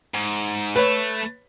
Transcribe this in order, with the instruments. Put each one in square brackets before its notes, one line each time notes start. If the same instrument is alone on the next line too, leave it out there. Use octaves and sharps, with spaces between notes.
[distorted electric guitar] G#2
[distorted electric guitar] A3 [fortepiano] B4 C#5